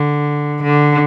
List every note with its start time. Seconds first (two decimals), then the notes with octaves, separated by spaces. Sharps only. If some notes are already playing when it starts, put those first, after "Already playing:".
Already playing: D3
0.63 D3